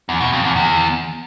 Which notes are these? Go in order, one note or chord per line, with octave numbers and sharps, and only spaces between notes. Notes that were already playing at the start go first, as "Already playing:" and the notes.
E2
B2
F2
E2
E2